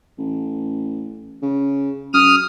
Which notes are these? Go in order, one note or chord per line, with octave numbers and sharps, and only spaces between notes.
A1
C#3
F#2 D#6 F6